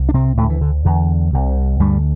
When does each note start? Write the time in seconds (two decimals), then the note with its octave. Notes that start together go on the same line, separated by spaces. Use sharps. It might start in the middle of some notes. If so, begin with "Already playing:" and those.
Already playing: C2
0.09 D4
0.14 C3 C4
0.37 D2 A2 A3
0.42 D3
0.50 E3
0.61 D3
0.85 E2 D3
1.33 C2 C3
1.79 D2 G2 D3 G3